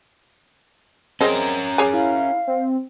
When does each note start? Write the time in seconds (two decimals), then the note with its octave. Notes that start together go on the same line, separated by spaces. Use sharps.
1.21 C4 C#4 G#4 A#4 D#5
1.78 G#4 C#5 G#5 D6
1.94 E4 F5
2.47 C4